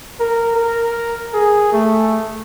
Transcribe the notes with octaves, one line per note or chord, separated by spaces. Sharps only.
A#4
A#4
G#4
A3